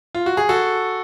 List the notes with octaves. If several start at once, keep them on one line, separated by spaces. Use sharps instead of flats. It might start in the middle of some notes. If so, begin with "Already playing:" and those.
F4
F#4
G#4
F#4 A4